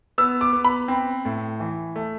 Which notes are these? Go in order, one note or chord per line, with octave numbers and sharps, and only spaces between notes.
B3 E6
D6
B3
B5
C4
A2
E3
A3